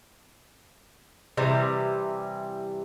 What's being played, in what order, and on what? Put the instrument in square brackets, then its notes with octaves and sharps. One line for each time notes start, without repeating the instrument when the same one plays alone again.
[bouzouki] C3 E3 G3